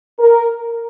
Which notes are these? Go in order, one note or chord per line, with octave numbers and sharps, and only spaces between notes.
A#4